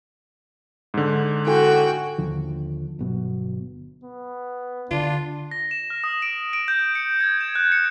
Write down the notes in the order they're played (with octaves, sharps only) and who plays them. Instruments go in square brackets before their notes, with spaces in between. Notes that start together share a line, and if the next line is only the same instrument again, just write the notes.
[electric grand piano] G#2 D3
[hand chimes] E4 A4 G#5 [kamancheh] F#4 G5
[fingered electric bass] D#2 D3 F3
G1 B2 F#3
[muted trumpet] B3
[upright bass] D3 [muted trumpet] D4 [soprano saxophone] F4
[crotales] A#6
E7
F6
D#6
D7
D7
G6
C#7
G#6
E7
F#6
C#7